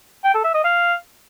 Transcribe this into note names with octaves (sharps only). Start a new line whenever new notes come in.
G5
A4
E5
D#5
F5